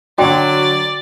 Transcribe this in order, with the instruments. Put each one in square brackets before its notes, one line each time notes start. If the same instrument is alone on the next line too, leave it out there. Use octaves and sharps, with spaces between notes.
[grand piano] D3 D4 [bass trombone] F#3 [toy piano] F#4 G5 [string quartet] D5